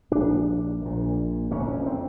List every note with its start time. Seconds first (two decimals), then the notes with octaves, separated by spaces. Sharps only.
0.11 A#1 A#2 D4
0.82 A#1 A#2
1.51 F#1 F2 D3 C#4
1.86 C4